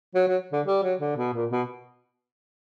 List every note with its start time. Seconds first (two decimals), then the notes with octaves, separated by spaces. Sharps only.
0.15 F#3
0.28 F#3
0.52 D3
0.66 G3
0.83 F#3
1.00 D3
1.17 B2
1.33 A#2
1.50 B2